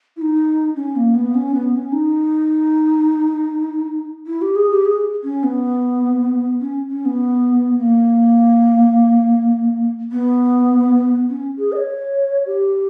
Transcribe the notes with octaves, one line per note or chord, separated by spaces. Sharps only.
E4
D#4
C#4
A#3
B3
C#4
B3
C#4
D#4
E4
G4
G#4
G4
G#4
C#4
B3
C#4
C#4
B3
A#3
B3
C#4
G#4
D#5
C#5
G4